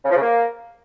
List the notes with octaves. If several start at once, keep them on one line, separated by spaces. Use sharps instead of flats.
C#3
F3
C#3
A#3